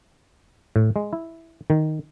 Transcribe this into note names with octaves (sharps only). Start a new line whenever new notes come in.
A2
G#3
E4
D#3